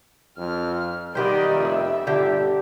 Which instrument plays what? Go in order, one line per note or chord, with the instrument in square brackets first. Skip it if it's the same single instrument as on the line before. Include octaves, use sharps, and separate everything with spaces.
[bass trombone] F2 [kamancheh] F6
[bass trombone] D#3 [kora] B3 G4 C5 [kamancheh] D5 D#5
[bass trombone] F1 [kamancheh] E5
[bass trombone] G1 [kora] D3 G4